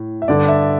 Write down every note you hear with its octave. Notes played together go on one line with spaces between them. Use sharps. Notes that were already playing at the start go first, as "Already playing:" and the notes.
Already playing: A2
E5
G2 D3 D5
E5